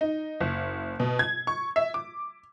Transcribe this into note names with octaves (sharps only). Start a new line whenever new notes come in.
D#4
F#1
B2
G#6
C#6
E5
D6